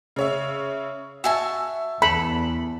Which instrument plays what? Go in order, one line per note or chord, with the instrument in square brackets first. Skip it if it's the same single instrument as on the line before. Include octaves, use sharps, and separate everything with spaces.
[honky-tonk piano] C#3 C#5 E5
[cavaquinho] F#4 G#5 A5 [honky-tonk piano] E5 E6
[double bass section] E2 [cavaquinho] A4 [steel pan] B5